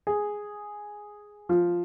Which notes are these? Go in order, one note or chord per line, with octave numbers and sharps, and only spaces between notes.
G#4
F3